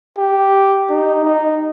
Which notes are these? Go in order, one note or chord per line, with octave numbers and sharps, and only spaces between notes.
G4
D#4
D#4